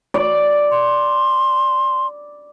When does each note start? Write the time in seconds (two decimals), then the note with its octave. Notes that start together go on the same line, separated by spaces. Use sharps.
0.14 D5
0.71 C6